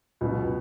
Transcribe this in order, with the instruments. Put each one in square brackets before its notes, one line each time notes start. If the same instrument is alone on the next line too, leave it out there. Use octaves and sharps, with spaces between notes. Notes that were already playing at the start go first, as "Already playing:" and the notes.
[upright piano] C#2 B2 F#3 B3